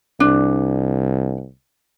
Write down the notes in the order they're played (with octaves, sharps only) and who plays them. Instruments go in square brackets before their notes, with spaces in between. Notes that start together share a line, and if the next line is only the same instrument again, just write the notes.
[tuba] C2 [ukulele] D4